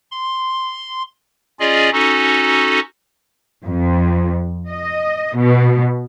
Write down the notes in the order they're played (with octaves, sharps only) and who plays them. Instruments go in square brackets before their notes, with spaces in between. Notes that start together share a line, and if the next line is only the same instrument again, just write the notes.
[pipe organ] C6
C#4 F4 G#4 D5 D#5
C#4 D#4 F#4 A4
[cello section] F2
D#5
B2